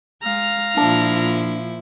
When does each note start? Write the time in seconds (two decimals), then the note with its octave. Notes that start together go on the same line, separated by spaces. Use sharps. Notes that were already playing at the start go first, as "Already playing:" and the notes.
0.23 G#3 F5 A#5
0.77 A#2 F3 D4 E4 A5